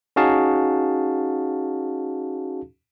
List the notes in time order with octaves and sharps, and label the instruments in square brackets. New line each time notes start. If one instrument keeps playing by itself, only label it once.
[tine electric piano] C#4 D#4 F#4 G#4 F5 A5